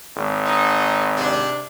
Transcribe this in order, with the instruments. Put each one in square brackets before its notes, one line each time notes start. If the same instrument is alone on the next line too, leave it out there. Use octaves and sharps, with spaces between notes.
[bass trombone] G#1
[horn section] D#4
C3 D4